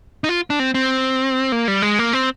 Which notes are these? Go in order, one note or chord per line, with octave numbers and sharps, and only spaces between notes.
D#4
F4
D4
C4
C4
A#3
G3
G#3
A#3
C4